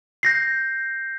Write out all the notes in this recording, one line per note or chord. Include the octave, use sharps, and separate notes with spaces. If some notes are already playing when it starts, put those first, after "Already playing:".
G6 A#6 C7